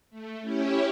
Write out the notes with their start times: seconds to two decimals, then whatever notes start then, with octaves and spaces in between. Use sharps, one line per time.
0.10 A3
0.41 C#4 E4 G4 C#5